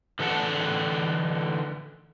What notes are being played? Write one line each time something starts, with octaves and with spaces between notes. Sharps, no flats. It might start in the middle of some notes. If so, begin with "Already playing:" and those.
D3 E3 A4 D5 F#5 A5